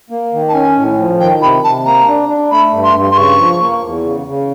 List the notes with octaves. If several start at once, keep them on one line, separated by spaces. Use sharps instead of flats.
A#3
D#3
A5
C#4 G#5
A2
F3
D#3 G5
C3 B5
C3 A5
A#3 A#5
D4
D4
A3 B5
G2
C6
G2
C6
C#3 C#6
F3
A#3
E2
C#3
C#3